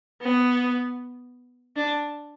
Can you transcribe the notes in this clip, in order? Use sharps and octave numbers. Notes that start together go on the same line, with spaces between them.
B3
D4